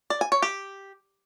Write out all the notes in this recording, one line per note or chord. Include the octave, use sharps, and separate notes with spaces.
D5
G#5
C#5
G4